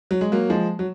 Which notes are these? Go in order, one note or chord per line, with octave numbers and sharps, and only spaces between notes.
F#3
G#3
F#3 A#3
F3 G#3
F#3